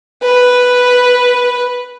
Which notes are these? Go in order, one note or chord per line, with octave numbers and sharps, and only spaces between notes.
B4